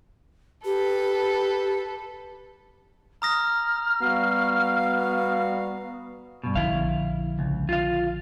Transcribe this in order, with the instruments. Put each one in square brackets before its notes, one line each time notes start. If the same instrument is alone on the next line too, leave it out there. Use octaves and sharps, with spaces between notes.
[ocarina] G4 [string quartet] A4 B4
[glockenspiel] A#5 D#6 A#6 [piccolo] F6
[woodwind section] G3 F#4 F5 [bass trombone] B3
[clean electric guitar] G2 B2
[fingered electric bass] A#1 D3 F3 [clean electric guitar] E4 F5
[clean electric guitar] C#2
F4 F5